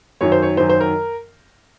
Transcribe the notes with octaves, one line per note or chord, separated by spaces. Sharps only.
F#2 D#3 F#3 C#5
C5
C#5
F#2 D#3 F#3 C5
C5
A#4